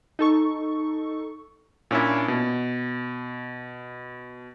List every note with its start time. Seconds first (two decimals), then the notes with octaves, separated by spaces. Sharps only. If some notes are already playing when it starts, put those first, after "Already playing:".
0.19 D#4 A4 C#6
1.91 A#2 C#4 D4 E4
2.28 B2